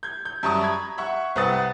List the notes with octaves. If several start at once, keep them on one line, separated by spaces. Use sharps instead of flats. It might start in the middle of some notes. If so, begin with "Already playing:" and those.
G6 G#6
G6
F#2 G3 E5 A5 C#6 D#6
A#5 B5 G#6
E5 F#5 C#6
C2 C4 B4 F#5 D#6 A6